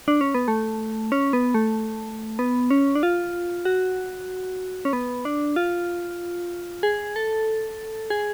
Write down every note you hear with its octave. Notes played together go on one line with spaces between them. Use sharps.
D4
C#4
B3
A3
C#4
B3
A3
B3
C#4
D4
F4
F#4
C#4
B3
D4
F4
G#4
A4
G#4